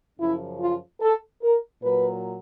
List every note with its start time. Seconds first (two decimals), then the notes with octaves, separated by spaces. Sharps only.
0.19 F#2 C#3 F3 E4
0.59 F4
1.00 A4
1.41 A#4
1.81 A#2 F#3 B4